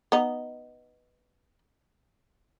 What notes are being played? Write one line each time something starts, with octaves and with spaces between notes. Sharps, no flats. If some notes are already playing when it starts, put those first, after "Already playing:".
B3 D#4